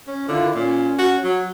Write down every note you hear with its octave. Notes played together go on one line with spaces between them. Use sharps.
C#4
D3 D#3 E4 F4
A#2 C#4
F#4
F#3